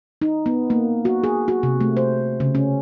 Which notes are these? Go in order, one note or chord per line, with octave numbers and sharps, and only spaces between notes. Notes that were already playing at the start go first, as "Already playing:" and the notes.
D#4
B3
A#3
F#4
G#4
F#4
C3
A3
C5
C#3
C#4